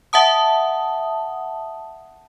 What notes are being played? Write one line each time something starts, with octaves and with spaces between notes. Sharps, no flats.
E5 F#5 A5 D#6